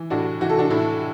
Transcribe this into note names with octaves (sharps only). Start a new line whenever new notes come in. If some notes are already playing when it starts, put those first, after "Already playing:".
Already playing: E3
A2 D4 F#4
E3 F#4
A4
D4 F#4
A2 E4